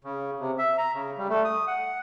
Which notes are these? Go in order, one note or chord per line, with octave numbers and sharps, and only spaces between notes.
C#3
C3
E5
A#5
C#3
G3
A3
D#6
F#5